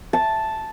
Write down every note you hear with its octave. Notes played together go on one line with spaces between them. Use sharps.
A5